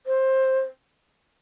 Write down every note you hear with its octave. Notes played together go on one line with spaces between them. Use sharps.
C5